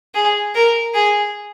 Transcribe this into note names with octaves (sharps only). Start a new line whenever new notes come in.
G#4
A#4
G#4